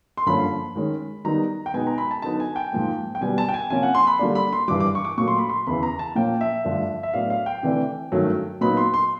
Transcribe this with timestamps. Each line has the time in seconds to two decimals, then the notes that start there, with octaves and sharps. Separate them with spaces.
0.17 C6
0.26 G2 D3 F3 A#3 C#4 B5
0.76 D#3 G#3 C#4
1.25 D#3 G3 B3 D#4 A#5
1.66 G5
1.74 B2 G#3 B3 D#4 G#5
1.87 A#5
1.98 B5
2.11 A5
2.22 D3 F#3 B3 D#4 A5
2.40 G#5
2.56 G5
2.73 G#2 F3 A#3
3.15 G5
3.21 B2 G3 B3 G#5
3.38 A5
3.48 G5
3.54 G#5
3.70 C3 F3 A#3 C#4 G#5
3.83 F#5
3.95 C6
4.07 B5
4.19 D3 G3 A#3 D4
4.35 B5
4.53 C6
4.68 G2 E3 G3 D6
4.80 D6
4.95 C#6
5.05 D6
5.18 A#2 F#3 A3 C#6
5.28 C6
5.38 B5
5.49 C6
5.67 E2 C#3 E3 B5
5.83 A#5
5.99 A5
6.16 A#2 F3 A#3 C#4 G5
6.41 E5
6.64 G2 D3 F3 A3 D4
7.03 E5
7.14 A2 F#3 B3 D4 F5
7.30 F5
7.46 G5
7.63 C3 E3 A3 D4
8.12 G2 D#3 F#3 A3 C#4
8.61 A#2 F#3 B3 D#4 B5
8.77 C6
8.94 C6